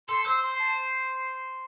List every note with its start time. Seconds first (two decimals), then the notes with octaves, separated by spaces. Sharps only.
0.09 A4 C6
0.26 C5 E6
0.42 C6
0.59 A5